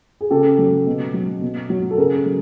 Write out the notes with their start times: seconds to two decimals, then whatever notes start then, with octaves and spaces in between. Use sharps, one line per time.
0.21 G#4
0.30 C#3 G4 A4
0.59 F#3
0.87 B2
1.14 F#3
1.42 B2
1.70 F#3
1.91 A4
1.98 C#3 G#4 A#4
2.26 F#3